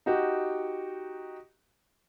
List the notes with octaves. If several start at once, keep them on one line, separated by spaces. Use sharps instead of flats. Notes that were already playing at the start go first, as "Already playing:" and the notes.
D#4 F#4 G4